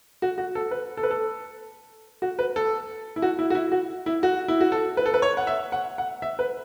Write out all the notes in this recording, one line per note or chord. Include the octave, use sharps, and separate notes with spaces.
F#4
F#4
A4
B4
A4
B4
A4
F#4
B4
A4
E4
F#4
E4
F#4
E4
F#4
E4
F#4
E4
F#4
A4
B4
A4
B4
C#5
F#5
E5
F#5
F#5
E5
B4